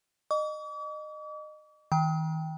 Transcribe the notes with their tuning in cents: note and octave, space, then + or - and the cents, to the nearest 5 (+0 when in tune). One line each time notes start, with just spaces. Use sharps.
D#5 -25 D6 -45
D#3 +40 G5 +0